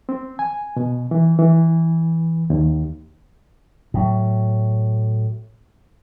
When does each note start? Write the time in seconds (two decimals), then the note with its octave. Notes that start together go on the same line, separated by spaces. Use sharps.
0.09 C4
0.39 G#5
0.76 B2
1.11 E3
1.39 E3
2.50 D#2
3.94 A2 F#3